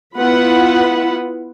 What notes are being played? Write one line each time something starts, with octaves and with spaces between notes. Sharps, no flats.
B3 E4 F4 B4 F#5 B5